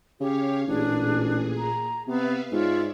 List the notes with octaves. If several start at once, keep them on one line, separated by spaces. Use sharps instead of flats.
C#3 G4 C#5 F5
A1 A#2 D4 G#4
A#5
C3 B3 B4 E5 F5
G#2 F4 C#5 D5 E5